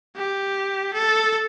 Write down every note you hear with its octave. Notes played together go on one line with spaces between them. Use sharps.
G4
A4